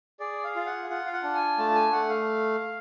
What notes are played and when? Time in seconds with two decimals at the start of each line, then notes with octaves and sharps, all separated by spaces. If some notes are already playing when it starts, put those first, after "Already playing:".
0.20 G#4 D5
0.44 F5
0.56 F4
0.66 F#5
0.90 F4 F#5
1.06 F5
1.13 F#5
1.23 D4
1.35 G#5
1.58 A3 A5
1.75 G#5
1.92 A3 F#5
2.09 F5